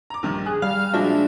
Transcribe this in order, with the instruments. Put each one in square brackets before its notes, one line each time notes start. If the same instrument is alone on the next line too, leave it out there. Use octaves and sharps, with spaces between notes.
[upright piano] A#5 D6
A#1 G2 D#3
[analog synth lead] G#4 [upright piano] F#6
[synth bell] G3 F5 [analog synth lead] F6
[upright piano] A#2 F3 G#3 [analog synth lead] D4 [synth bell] F#4 E5